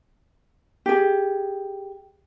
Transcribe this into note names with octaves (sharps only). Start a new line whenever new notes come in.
G4 G#4